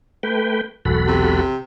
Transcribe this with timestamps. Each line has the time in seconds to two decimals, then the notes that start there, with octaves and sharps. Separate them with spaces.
0.23 A3 B4 G5
0.85 E1 B1 F#4 A4 B5
1.07 C3